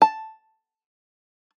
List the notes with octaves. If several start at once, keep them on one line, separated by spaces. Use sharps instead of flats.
A5